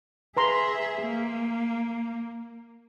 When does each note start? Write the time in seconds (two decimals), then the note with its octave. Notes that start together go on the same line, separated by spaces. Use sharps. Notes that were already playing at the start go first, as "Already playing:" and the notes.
0.37 G#4 B4 E5 A#5 C6
1.01 A#3